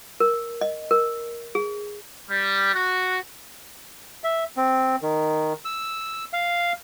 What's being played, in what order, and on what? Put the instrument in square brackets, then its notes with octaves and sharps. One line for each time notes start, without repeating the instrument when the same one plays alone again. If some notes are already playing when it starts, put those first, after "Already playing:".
[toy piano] A#4
D#5
A#4
G#4
[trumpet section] G3
F#4
[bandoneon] E5
C4
D#3
E6
F5